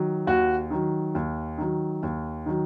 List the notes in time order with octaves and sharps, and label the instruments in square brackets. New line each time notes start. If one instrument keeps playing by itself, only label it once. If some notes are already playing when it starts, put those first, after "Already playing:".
Already playing: [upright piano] D#3 F#3
D#2 F#4
D#3 F#3
D#2
D#3 F#3
D#2
D#3 F#3